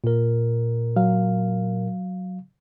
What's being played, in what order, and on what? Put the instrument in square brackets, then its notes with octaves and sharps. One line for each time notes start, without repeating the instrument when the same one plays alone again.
[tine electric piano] A#2 A#4
[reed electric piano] F#3 F5